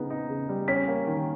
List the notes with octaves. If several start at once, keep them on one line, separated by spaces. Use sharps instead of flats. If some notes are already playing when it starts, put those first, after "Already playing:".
Already playing: C#3 B3 D#4
D#4
C#3
G3
C#4 B6
A#3
D#3